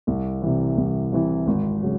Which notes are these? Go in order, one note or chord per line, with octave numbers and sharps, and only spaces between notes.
C2
C3 E3
C2
C3 E3
G#1
C#3 F#3